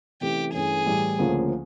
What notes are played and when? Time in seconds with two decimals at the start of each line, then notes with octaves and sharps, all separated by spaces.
0.21 C3 E3 A3 C#4 G4
0.53 G2 E3 A3 C#4 G#4
0.86 A2 E3 G3
1.19 D2 C#3 F3 A#3 C#4